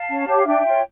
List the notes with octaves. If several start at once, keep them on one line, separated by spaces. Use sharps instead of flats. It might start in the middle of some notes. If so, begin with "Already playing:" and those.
Already playing: F5 A5
C#4
G4 C#5
F5
D4 E5 G5
F4 C#5